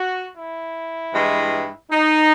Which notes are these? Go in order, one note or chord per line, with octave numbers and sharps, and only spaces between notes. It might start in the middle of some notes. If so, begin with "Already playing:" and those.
Already playing: F#4
E4
G2 E3 G#3
D#4